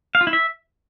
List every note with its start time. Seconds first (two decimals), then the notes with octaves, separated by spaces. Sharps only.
0.15 F5
0.21 F4
0.27 E4
0.33 E5